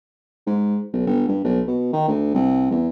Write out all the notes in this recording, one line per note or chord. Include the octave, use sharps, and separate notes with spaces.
G#2
B1
G1
G2
B1
B2
D#3
D2
C2
E2